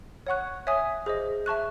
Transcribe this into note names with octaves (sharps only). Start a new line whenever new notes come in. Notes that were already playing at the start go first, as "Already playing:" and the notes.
C#5 F#5 C#6 F#6
C#5 E5 G#5 D#6
G#4 C5 D#5
E5 A5 C#6 F#6